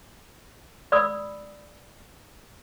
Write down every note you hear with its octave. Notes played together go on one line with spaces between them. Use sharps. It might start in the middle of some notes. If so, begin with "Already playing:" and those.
D5 B5 D#6 E6